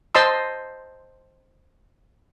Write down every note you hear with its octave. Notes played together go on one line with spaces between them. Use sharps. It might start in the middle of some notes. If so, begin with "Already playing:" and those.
C5 D#5 A5 C6 E6